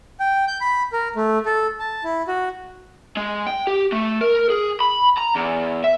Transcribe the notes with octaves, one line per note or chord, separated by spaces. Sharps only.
G5
G6
B5
A#4
A3
A4
A5
E4
F#4
G#3
G5
G4
A3
A#4
G#4
B5
A#5
E2
E5